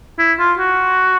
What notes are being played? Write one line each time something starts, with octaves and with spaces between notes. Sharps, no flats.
E4
F4
F#4